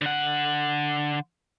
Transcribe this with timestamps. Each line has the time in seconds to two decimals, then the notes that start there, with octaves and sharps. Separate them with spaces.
0.01 D3 F#5